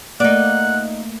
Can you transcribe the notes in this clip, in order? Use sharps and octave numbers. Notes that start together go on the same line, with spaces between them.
A3 A#3 D#4 D5 F#5